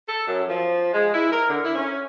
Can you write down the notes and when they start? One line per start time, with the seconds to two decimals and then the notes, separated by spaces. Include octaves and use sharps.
0.08 A4
0.27 F#2
0.48 F3
0.93 G#3
1.13 E4
1.32 A#4
1.49 D3
1.64 E4
1.75 C#4